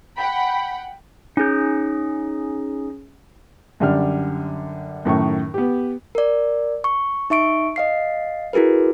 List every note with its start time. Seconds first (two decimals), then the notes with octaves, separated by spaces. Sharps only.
0.16 F#5 G5 B5
1.37 C#4 D#4 G#4 G6
3.80 F#2 D3 G3 F6
5.05 F#2 A2 D#3 C#6
5.54 B3 G4
6.15 A#4 D5
6.84 C#6
7.30 D#4 E5 C#6 D7
7.76 D#5 F5 C7
8.53 E4 F#4 G#4 A#4 B4